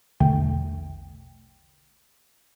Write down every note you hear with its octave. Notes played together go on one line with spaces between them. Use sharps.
A#1 E2 B2 D3 A3 G5